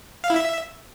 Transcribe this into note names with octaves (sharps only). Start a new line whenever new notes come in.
F5
E4
E5